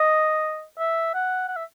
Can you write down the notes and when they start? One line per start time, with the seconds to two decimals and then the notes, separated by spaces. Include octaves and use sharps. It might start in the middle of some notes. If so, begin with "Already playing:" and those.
Already playing: D#5
0.79 E5
1.14 F#5
1.48 F#5
1.56 E5